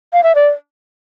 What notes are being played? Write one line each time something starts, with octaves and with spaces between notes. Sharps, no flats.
F5
E5
D5